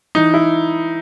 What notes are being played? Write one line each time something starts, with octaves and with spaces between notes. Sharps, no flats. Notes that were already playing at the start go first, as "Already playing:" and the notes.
E3 D#4
E4